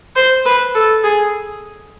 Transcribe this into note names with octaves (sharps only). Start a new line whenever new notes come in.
C5
B4
A4
G#4